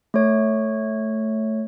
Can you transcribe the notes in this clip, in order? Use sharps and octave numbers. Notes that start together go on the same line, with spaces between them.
A3 C#5